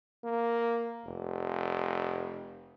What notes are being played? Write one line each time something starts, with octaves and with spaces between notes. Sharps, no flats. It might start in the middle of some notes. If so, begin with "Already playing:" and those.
A#3
F1